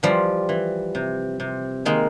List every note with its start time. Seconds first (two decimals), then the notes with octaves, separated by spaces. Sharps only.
0.03 E3 F3 G3
0.49 E3
0.95 C3
1.40 C3
1.85 D#3 G#3 A#3